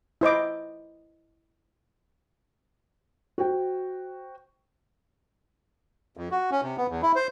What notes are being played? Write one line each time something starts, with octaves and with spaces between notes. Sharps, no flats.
E4 C5 D#5 D6
F#4 C5 G5
F2
F#4
C#4
C3
B3
E2
E4
C5